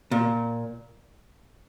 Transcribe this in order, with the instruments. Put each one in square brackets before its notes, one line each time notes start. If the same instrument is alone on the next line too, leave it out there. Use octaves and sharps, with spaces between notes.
[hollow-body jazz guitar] A#2